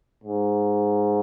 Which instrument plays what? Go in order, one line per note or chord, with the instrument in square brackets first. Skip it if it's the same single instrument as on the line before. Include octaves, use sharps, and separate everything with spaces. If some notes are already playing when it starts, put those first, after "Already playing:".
[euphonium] G#2